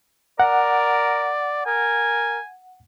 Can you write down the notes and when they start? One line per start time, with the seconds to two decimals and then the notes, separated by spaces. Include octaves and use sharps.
0.40 A#4 D5 F#5
1.67 A#4 G#5